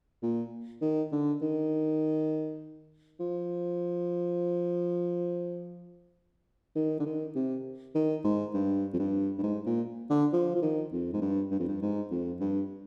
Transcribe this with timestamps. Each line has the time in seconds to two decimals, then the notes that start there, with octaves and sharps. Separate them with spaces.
0.23 A#2
0.82 D#3
1.12 D3
1.42 D#3
3.20 F3
6.75 D#3
7.00 D3
7.06 D#3
7.35 C3
7.95 D#3
8.24 G#2
8.54 G2
8.93 F2
8.99 G2
9.38 G2
9.43 G#2
9.66 A#2
10.10 D3
10.33 F3
10.55 F3
10.62 D#3
10.92 F2
11.14 G#2
11.21 G2
11.51 G2
11.59 F2
11.68 G2
11.81 G#2
12.11 F2
12.41 G2